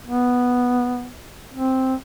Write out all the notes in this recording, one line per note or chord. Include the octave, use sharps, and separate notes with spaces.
B3
C4